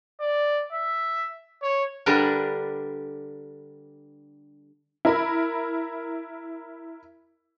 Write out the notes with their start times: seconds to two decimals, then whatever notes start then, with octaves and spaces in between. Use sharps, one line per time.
0.20 D5
0.72 E5
1.62 C#5
2.06 D3 G3 D4 G4 A#4 B4
5.05 E4 A#4 B5